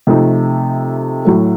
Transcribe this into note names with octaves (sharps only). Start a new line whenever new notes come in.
C3 F3 A3 D#4
A2 F#3 A3